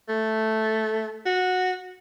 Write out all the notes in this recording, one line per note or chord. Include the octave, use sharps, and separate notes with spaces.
A3
F#4